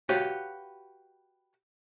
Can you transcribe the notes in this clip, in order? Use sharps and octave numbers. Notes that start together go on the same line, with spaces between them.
F#4 G4 B4 C#5 F5 F#5